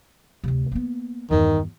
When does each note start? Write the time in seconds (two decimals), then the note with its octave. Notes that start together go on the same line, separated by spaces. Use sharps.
0.44 D2 C3
0.72 A#3 B3
1.31 E2 G2 D#3